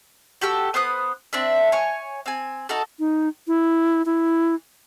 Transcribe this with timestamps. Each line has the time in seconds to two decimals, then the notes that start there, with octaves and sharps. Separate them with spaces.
0.41 F#4 G4 A4 E6
0.74 B3 C5 D#6 F#6
1.33 C4 D4 E5
1.72 C#5 G#5 C#6
2.26 C4 G#5
2.69 D#4 F#4 A4
2.99 D#4
3.48 E4
4.06 E4